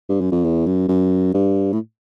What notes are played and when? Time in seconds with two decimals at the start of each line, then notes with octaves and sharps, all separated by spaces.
0.09 G2
0.21 F#2
0.32 F2
0.44 E2
0.66 F#2
0.88 F#2
1.34 G2
1.72 A2